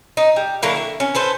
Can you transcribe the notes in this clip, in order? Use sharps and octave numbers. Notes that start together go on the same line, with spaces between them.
D#4
G3
D3 F#3 A#3 E4
E5
C#4
A4 B4 C5